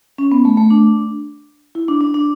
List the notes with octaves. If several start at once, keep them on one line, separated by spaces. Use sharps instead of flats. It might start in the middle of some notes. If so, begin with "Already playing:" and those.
C#4
B3
A3
A3
D4
E4
D4
D4
D4